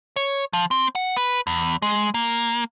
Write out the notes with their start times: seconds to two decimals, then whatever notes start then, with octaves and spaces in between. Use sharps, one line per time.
0.16 C#5
0.53 F3
0.71 C4
0.95 F#5
1.16 B4
1.47 E2
1.82 G#3
2.14 A#3